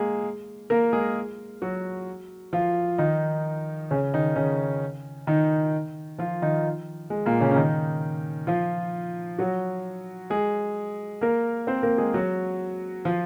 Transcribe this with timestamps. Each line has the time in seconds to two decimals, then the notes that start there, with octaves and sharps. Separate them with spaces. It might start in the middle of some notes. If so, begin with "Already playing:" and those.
Already playing: G#3 A#3 G#4
0.70 A#3 A#4
0.93 G#3 G#4
1.62 F#3 F#4
2.53 F3 F4
2.98 D#3 D#4
3.91 C#3 C#4
4.14 D#3 D#4
4.36 C#3 C#4
5.27 D#3 D#4
6.19 F3 F4
6.42 D#3 D#4
7.10 G#3
7.26 A#2 A#3
7.41 C#3 C#4
7.51 C#4
7.56 D#3 D#4
8.47 F3 F4
9.39 F#3 F#4
10.30 G#3 G#4
11.21 A#3 A#4
11.67 C4 C5
11.83 A#3 A#4
11.98 G#3 G#4
12.14 F#3 F#4
13.05 F3 F4